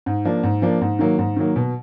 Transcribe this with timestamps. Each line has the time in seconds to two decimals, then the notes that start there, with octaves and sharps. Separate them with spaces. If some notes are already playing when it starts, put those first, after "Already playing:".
0.06 G#2
0.25 F3 A#3 D4
0.43 G#2
0.62 F3 A#3 D4
0.81 G#2
0.99 D#3 F#3 A#3
1.18 G#2
1.36 D#3 F#3 A#3
1.56 B2